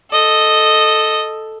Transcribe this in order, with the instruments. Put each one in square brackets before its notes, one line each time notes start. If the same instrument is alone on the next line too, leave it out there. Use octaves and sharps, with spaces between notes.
[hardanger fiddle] A4 D#5